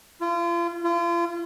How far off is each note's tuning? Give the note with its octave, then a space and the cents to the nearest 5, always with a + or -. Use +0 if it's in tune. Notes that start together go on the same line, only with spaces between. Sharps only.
F4 -35
F4 -35